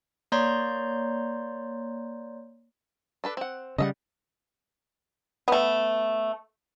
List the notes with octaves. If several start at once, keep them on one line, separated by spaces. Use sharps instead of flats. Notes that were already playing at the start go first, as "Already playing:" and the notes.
A#3 C#5 D5 A#5 C6 G6
D4 A4 B4
C4 F#5
C#3 G3 D#5 E5 F#5
A3 B3